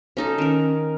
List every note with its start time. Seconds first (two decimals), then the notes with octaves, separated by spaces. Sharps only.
0.17 C#4 D#4 A4
0.38 D#3 C#4 A#4